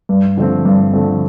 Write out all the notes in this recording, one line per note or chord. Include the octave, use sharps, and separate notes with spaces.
G2
D3 F3 A3 C4
G2
D3 F3 A3 C4